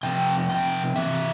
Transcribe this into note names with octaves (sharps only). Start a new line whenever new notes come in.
C3 F3 C4 G5
G5
C3 E3 E5